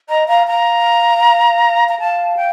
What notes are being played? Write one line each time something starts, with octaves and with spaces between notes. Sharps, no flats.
D#5 A#5
F5 A#5
F5 A#5
A#5
F5 A5
G5